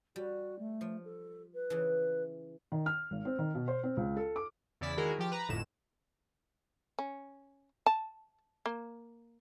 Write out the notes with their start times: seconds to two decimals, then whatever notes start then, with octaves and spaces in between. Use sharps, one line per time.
0.16 G3 F#4
0.59 A3
0.81 F3
1.05 A4
1.54 B4
1.70 C#3 E3
2.72 D#3
2.86 F6
3.11 G#1
3.25 C4
3.39 D#3
3.55 B2
3.68 C5
3.83 C4
3.97 C#2
4.17 A4
4.36 D6
4.81 E2 C#3 E4 D5 B6
4.97 D#3 G#3 E4 F#4 G#4 A#4
5.19 F3 G4
5.32 B4 A#5
5.49 G1 F2 A2 E7
6.99 C#4
7.86 A5
8.66 A#3